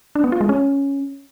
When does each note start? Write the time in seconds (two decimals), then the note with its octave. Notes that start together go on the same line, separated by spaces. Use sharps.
0.15 D4
0.24 B3
0.32 F4
0.41 G#3
0.49 C#4